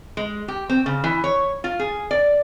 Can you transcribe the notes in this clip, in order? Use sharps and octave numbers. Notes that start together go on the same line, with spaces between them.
G#3
G4
C4
C#3
E3
C#5
F4
G#4
D5